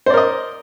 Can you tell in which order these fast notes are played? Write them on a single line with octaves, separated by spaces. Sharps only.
C5 D5 A#4 D#5